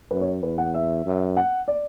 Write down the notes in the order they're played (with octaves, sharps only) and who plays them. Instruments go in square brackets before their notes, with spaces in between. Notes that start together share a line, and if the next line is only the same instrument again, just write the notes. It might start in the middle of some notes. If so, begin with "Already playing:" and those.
[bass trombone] F#2 [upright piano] B4
[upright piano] C#5
[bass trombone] E2 [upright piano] B4
[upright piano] F#5
E5
[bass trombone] F#2
[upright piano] F#5
D5